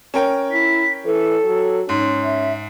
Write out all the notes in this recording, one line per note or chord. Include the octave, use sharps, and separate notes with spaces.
C#4 A#4 G5
E4 B6
E3 A4
F#3
G#2 C#4
E5